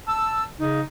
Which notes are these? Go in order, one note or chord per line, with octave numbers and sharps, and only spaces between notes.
A5 E6
C#3 D#4